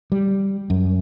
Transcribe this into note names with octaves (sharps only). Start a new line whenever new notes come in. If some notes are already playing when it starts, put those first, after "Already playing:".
G3
F#2